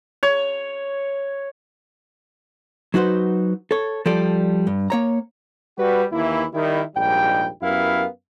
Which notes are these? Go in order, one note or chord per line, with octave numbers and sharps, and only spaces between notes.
C#5
F#3 D#4 F#4 B4 C5
A4 C#5
F3 G3 A4 D5
G2
A#3 C#5 A#5
G3 F#4 B4
D#2 E3 A#3 E4
D#3 G3 E4
A#1 D#2 G#2 G3 G5
F#2 B3 E4 G4 A#4 F5